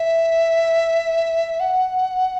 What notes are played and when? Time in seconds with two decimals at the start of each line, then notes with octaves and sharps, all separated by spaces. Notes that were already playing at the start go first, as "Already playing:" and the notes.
Already playing: E5
1.60 F#5